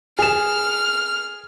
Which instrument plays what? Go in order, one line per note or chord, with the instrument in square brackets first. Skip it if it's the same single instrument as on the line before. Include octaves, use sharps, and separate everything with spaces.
[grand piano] G#4 E7 [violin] F6